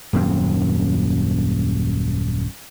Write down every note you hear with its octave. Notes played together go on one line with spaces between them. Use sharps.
D#1 F#2 F3 C4